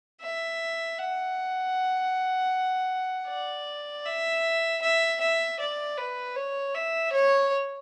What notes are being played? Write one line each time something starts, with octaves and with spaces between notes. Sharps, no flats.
E5
F#5
D5
E5
E5
E5
D5
B4
C#5
E5
C#5